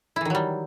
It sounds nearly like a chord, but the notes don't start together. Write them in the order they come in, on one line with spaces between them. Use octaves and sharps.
E4 E3 D#3 F#3 G3